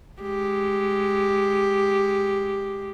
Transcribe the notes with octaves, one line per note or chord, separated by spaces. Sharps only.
G#3 G4